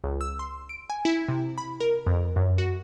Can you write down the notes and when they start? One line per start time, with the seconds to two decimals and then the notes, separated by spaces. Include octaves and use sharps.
0.04 C#2
0.21 E6
0.39 C6
0.69 D7
0.90 G#5
1.05 E4
1.28 C3
1.58 B5
1.80 A#4
2.07 F2
2.36 F#2
2.58 F#4